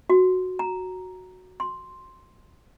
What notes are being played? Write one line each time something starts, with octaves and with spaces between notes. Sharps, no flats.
F#4
A#5
C6